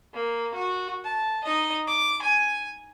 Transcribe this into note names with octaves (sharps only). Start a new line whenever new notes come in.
A#3
F#4
A5
D#4 D#5
D6
G#5